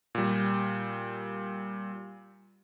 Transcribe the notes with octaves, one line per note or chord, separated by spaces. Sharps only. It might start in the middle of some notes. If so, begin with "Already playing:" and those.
A#2 G3